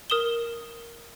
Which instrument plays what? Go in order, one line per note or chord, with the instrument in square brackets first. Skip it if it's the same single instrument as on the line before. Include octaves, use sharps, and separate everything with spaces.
[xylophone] A#4 D#6 E7 G7